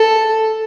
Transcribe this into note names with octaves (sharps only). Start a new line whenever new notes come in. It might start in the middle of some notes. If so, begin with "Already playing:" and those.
Already playing: A4